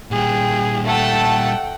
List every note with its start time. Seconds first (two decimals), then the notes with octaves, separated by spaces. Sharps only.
0.11 A#2 G3 G#4 G5
0.87 A3 A4 F#5 G5 A5